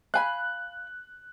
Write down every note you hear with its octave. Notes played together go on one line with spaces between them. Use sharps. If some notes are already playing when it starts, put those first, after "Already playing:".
F5 G#5 B5 F#6